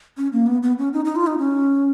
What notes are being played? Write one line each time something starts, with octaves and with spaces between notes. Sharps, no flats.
C#4
A#3
B3
B3
C#4
D#4
D#4
F4
D#4
C#4